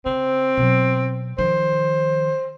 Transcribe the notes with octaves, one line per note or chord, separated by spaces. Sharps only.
C#3 C4
B2 F#3
D#3 F3 C5